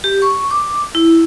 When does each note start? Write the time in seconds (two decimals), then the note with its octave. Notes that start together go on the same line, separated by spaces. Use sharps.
0.04 G4
0.22 C#6
0.51 D6
0.95 E4